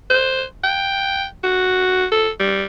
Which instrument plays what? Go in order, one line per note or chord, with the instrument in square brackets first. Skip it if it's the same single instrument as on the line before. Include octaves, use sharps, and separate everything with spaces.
[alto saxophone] C5
G5
F#4
A4
G3